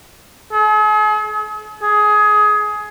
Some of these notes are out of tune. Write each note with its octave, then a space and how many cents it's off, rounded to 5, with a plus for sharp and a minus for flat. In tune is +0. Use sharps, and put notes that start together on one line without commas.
G#4 +45
G#4 +20